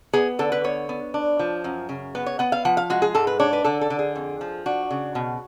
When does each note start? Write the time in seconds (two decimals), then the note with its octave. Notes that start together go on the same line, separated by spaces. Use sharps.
0.13 B3 G#4
0.39 D3 A4
0.52 B4
0.64 B3 C#5
0.89 B3
1.14 D4
1.39 F3
1.64 F#2
1.89 C#3
2.15 B3 B4
2.26 C#5
2.39 B3 F#5
2.52 F5
2.65 F3 F#5
2.77 F5
2.90 G#3 F#4
3.02 G#4
3.15 G#2 A4
3.27 B4
3.40 D4 C#5
3.53 B4
3.64 D3 A4
3.81 A4
3.90 D3
3.99 G#4
4.16 F2
4.41 F3
4.66 D4 F#4
4.91 C#3
5.15 B2